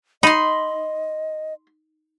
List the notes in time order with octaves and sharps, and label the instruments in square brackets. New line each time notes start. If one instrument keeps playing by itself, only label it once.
[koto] D#4 [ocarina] D#5 [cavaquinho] B5 C6